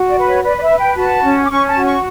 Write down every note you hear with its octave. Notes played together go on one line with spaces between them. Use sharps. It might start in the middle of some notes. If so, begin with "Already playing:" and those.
Already playing: F#4
D5
B4
C#5
B4 D5
D5
E5
B4
G5
F#4 A5
C#4
D6
C#4 C#6
A5
F#4
C#6